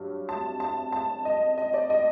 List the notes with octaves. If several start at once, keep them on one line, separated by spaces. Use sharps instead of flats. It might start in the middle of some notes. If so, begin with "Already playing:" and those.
Already playing: G2 F#3
A5
A5
A5
D#5
D#5
D5
D#5